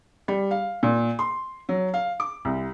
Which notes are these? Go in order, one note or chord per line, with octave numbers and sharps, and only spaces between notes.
G3
F5
A#2
C6
F#3
F5
D6
C2